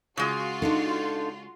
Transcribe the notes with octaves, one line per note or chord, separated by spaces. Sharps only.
C#3 G#3 F4 F#4
D4 D#4 A4